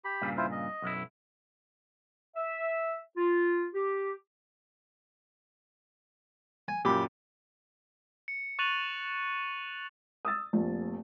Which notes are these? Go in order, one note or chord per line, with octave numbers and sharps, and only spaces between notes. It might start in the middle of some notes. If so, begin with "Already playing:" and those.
G4 B5
G2 A#2 C#3
E4 F4 C5
D#5
B1 F#2 E4
E5
F4
G4
G#5
F#2 A#2 G4 B5
C#7
C#6 F#6 A6 D#7 F7 F#7
D#6 E6 A6
F1 A#1